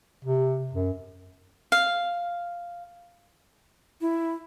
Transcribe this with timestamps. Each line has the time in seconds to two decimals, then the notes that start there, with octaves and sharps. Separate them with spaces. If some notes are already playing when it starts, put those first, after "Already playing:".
0.25 C3
0.73 F#2
1.72 F5
4.01 E4